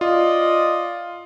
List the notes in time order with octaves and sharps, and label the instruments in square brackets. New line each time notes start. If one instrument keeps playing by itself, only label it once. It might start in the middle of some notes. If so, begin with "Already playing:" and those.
[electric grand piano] F4 [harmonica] D5 D#5